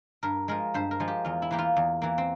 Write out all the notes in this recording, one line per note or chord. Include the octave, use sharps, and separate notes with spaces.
G2 A#4
F3 G#3 A#4
G2 C5
A#4
F3 G#3
G4
E2 F4
E4
E3 A#3 G4
F4
E2
E3 A#3
C4